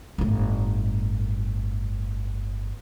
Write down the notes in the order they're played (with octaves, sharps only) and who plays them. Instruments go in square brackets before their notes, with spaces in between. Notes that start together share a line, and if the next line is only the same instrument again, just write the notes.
[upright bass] G1 A2